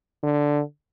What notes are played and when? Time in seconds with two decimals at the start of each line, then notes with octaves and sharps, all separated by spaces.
0.24 D3